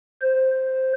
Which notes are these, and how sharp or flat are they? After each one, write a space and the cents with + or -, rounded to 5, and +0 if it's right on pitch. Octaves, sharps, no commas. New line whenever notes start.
C5 +0